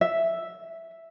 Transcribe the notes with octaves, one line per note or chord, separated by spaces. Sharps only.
E5